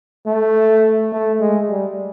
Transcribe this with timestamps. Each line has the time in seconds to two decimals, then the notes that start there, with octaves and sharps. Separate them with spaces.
0.26 A3
1.12 A3
1.40 G#3
1.69 G3